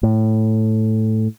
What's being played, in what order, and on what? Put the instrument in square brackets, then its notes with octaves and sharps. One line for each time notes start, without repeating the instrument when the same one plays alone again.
[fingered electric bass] A2